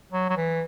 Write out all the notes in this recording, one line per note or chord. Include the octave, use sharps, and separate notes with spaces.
F#3
F#3
E3